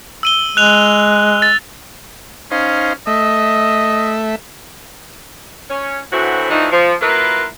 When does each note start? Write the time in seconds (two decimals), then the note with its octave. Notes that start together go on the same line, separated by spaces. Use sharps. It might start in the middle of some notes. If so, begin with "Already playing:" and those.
0.23 E6 D#7 G7
0.57 G#3 F#6 F7
1.42 A6
2.51 C#4 D#4 C5 F5
3.07 A3 D#5 E5
5.70 C#4
6.13 D2 A2 E3 F#3 F#4 C5
6.50 E3 F3 A3 D4 D#4
6.72 F3
7.01 F#3 A#3 E4 F4 A#4 B4